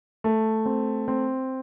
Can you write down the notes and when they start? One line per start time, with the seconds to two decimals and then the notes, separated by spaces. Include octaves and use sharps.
0.24 A3
0.66 C4
1.08 C4